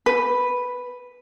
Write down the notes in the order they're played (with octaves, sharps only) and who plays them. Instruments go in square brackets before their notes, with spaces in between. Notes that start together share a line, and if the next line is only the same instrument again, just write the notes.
[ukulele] B4